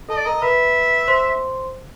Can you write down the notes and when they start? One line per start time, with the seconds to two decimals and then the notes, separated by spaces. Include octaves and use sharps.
0.09 A4 D#5 A5
0.17 D5
0.25 A#4 D#5 A#5
0.42 B4 E5 B5
1.08 C5 C6